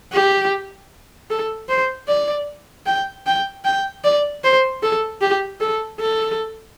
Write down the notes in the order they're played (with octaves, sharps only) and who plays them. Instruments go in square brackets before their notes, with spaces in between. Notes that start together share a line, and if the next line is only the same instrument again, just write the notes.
[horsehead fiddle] G4
A4
C5
D5
G5
G5
G5
D5
C5
A4
G4
A4
A4